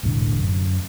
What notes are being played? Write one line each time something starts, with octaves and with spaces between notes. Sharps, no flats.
E1 C2 A2 D3
F#2